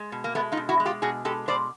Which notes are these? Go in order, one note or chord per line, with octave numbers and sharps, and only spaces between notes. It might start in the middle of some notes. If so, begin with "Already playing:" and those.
Already playing: G#3
B2
A#3
G#3 A3 B3
D#4 F4
B2
E4 F#4
G#3
F4 G4
B2 F#4 G#4
G#3 G4 A4
B2 C5 D5